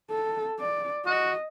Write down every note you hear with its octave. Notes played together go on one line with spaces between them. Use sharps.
A4
D5
F#4 D#5